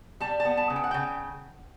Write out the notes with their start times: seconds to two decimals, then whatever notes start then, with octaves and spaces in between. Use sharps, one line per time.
0.21 G3 A5
0.40 A5
0.45 B3
0.57 A5
0.70 C#3
0.76 G5
0.84 F#5
0.91 C#3 G5